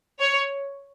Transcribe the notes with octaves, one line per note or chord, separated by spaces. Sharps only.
C#5